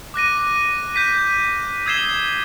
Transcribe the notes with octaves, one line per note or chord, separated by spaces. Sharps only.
D6 F#6 A#6 D#7
G6 B6 D#7
D#6 E6 G#6 C7 E7 G7